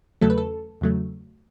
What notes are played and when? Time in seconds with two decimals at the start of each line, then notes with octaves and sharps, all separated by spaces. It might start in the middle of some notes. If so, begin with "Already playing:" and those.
0.21 E2 C#3 F#3 A3 A4
0.30 B4
0.38 A4
0.81 E2 C#3 F#3 A3